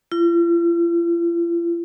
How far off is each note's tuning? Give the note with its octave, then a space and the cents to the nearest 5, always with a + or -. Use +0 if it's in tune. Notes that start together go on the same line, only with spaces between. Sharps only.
F4 -45